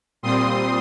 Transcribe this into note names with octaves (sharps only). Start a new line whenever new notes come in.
A#2 G3 C4 C6 D#6